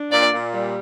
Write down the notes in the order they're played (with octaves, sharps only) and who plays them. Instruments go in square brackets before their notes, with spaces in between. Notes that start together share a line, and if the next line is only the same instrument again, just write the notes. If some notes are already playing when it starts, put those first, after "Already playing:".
Already playing: [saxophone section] D4
[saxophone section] A#2 [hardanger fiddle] D5
[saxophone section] A#2
G3